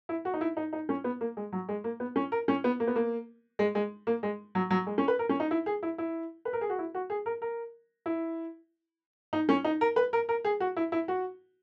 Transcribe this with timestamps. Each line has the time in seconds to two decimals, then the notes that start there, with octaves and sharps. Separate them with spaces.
0.09 E4
0.25 F#4
0.34 D#4
0.41 E4
0.57 D#4
0.73 D#4
0.89 C#4
1.04 B3
1.21 A#3
1.37 G#3
1.52 F#3
1.69 G#3
1.84 A#3
2.00 B3
2.16 C#4
2.32 A#4
2.48 C#4
2.64 B3
2.80 A#3
2.87 B3
2.96 A#3
3.59 G#3
3.75 G#3
4.07 A#3
4.23 G#3
4.55 F#3
4.70 F#3
4.87 G#3
4.98 C#4
5.08 B4
5.19 A#4
5.29 C#4
5.40 D#4
5.51 E4
5.66 G#4
5.83 E4
5.98 E4
6.45 B4
6.53 A#4
6.61 G#4
6.70 F#4
6.79 E4
6.95 F#4
7.10 G#4
7.26 A#4
7.42 A#4
8.06 E4
9.33 D#4
9.49 C#4
9.65 D#4
9.81 A#4
9.96 B4
10.13 A#4
10.29 A#4
10.45 G#4
10.60 F#4
10.77 E4
10.92 E4
11.08 F#4